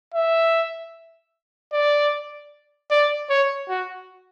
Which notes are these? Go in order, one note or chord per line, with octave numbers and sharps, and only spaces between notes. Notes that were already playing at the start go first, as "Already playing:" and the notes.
E5
D5
D5
C#5
F#4